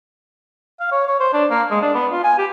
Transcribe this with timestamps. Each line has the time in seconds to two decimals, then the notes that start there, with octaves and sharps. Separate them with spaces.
0.80 F5
0.92 C#5
1.07 C#5
1.20 C5
1.33 D4
1.50 A#3
1.71 G#3
1.82 D4
1.95 B3
2.12 F4
2.24 G#5
2.38 G4